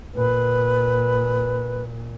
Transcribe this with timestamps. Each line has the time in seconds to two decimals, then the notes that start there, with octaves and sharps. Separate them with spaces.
0.15 A#2 B4